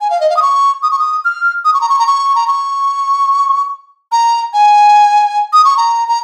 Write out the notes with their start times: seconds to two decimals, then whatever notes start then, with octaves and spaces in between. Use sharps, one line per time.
0.01 G#5
0.10 F5
0.21 D#5
0.30 F5
0.37 D#6
0.42 C#6
0.83 D#6
0.91 C#6
0.99 D#6
1.25 F6
1.65 D#6
1.74 C#6
1.81 A#5
1.89 C#6
1.99 A#5
2.07 C#6
2.35 A#5
2.48 C#6
4.12 A#5
4.53 G#5
5.53 D#6
5.65 C#6
5.77 A#5
6.09 A#5